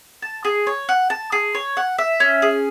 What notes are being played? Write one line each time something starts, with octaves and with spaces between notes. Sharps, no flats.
A5
G#4
C#5
F#5
A5
G#4
C#5
F#5
E5
C#4
G#4